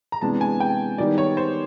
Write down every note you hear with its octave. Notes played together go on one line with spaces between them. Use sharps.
A#5
C3 E3 G#3 B3 D4 A5
G#5
G5
D#3 G3 B3 D#4 D5
C#5
C5